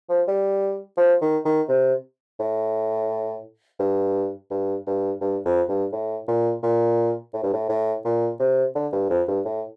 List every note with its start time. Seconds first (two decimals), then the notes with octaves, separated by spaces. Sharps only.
0.09 F3
0.28 G3
0.97 F3
1.22 D#3
1.45 D#3
1.68 C3
2.40 A2
3.80 G2
4.51 G2
4.87 G2
5.21 G2
5.45 F2
5.69 G2
5.92 A2
6.28 A#2
6.63 A#2
7.34 A2
7.43 G2
7.53 A2
7.69 A2
8.05 A#2
8.40 C3
8.75 D3
8.93 G2
9.10 F2
9.28 G2
9.45 A2